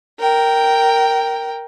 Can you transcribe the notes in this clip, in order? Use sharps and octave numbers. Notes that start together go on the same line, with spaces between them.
A#4 G5